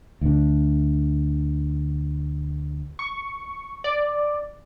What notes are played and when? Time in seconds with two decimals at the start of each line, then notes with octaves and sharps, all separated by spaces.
0.21 D2 D3
2.99 C#6
3.84 D5